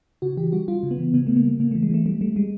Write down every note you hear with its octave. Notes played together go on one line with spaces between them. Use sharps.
C#3 F#4
E3 G4
G3 F#4
G3 F4
C#3
B3
E3
C#3 B3
C#3 A3
A#3
G3
C#3 A#3
E3 A3
G#3
E3 A3
G3 A3
G3 A3
G3 G#3